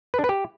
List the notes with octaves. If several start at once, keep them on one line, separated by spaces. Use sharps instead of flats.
B4
D4
B4
G4